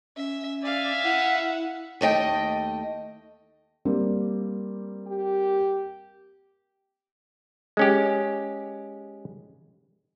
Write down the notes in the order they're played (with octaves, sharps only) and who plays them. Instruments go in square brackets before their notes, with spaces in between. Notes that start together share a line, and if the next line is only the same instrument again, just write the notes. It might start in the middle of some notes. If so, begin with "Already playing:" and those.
[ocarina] C#4 [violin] E5
[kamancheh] D5 [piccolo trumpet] E5 [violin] F5 G#5
[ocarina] E4 [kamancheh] F#5
[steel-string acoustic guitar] D#2 A3 D#5 G5
[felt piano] G3 A#3 C4
[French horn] G4
[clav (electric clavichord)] G#3 C#4 G4